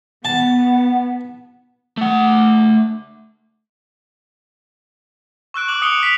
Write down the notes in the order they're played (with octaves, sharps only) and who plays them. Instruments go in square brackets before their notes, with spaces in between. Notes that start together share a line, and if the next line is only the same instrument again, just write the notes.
[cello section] B3 [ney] F#5 [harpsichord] A5
[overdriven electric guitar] A3 F#5
[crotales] C#6 E6 F#6 D7
D6 F#6 F#7
D#6 C#7 D7 F7 G7
B6 D7 F7